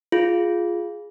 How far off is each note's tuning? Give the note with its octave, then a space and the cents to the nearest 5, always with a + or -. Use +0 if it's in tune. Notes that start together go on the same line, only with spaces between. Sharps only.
F4 +0 G#4 +0